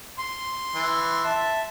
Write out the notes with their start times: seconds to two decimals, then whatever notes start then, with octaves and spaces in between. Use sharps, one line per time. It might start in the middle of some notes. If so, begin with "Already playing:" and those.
0.18 C6
0.75 E3
1.24 E5 A5